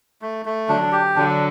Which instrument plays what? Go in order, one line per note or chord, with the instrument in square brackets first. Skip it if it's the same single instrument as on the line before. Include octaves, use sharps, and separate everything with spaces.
[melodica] A3
A3
[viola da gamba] D3 F#3 [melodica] D4
[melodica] G4
[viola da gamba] D3 F#3 [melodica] D4